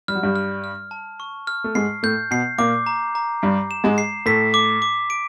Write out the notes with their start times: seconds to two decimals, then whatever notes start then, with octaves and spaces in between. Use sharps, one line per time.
0.08 G3 F6
0.15 F#3
0.23 G2 G3
0.36 F6
0.64 F6
0.91 A5
1.20 C#6
1.47 F6
1.64 A3
1.75 G#2 G#3 C7
2.03 A2 A3 G6
2.31 B2 B3 C7
2.58 A#2 A#3 D6
2.86 A#5
3.15 A#5
3.42 G2 G3 C7
3.71 E7
3.84 G#2 G#3
3.98 C7
4.26 A2 A3 B6
4.54 D6
4.82 D6
5.10 D7